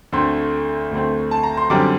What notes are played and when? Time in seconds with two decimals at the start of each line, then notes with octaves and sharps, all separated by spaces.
0.12 D2 D3 A3 C4 C6
0.91 D2 D3 A3 C4
1.31 A5
1.43 A#5
1.57 C6
1.70 F#2 D3 G3 C4 D6